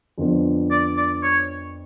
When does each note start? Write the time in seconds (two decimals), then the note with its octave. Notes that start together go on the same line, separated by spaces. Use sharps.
0.18 F2 D3 F3 B3 D4
0.70 D5
0.97 D5
1.23 C#5